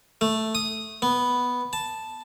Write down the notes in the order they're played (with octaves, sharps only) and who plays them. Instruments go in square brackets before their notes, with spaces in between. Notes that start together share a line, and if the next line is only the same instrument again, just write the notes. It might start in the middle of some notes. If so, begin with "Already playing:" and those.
[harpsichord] A3
D#6
B3
A5